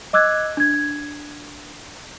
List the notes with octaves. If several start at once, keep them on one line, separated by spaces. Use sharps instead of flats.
D#5 D6 E6 F#6 G#6
D4 G#6